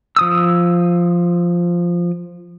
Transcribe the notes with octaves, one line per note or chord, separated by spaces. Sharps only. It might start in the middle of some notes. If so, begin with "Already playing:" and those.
F3 D#6 E6